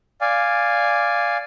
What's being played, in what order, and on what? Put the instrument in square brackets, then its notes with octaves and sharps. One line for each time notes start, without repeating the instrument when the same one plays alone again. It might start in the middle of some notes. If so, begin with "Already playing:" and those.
[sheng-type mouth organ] D5 F5 G#5